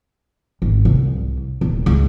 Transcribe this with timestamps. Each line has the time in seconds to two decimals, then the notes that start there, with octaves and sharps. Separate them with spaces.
0.62 G#1
0.85 C2
1.61 D#1
1.86 C#2